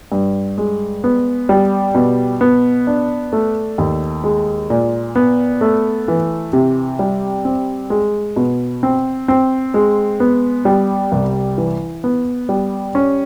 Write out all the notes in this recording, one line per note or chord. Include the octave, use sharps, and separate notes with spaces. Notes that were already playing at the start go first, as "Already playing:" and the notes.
G2
G#3
B3
G3
B2
B3
D4
A3
D#2
G#3
A#2
B3
A3
E3
C3
G3
C4
G#3
B2
C4
C4
G#3
B3
G3
C2
E3
B3
G3
C#4